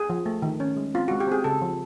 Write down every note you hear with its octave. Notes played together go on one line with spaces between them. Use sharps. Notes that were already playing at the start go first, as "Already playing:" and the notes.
Already playing: G#4
F3
A3
D#3
C#4
G#3
C4 F4
G#3 F#4
G4
C4 G#4
C#3 A4
F3